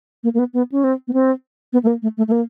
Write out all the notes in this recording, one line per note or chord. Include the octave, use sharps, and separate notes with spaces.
A#3
A#3
B3
B3
C#4
C4
B3
C4
B3
A3
A#3
A3
A3
A3
A#3